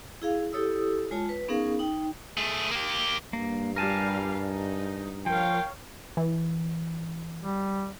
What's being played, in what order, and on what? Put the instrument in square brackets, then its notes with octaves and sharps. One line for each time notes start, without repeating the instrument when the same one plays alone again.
[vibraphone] E4 G#4 F5
E4 G4 A4 C#5 D#6 E6
G#3 F4 C#5 A5
B4
B3 C#4 D#4 G#4 A#4 F5
D#4 G5
[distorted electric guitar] A3 G#4
A#3 G4
[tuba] G2 [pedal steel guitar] A#3
[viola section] G3 F4 F5 [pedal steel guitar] A#4 G#5 A5
[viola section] D#4
[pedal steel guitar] F3 [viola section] A#4 C#5 F5 [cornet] G5
[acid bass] E3
[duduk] G3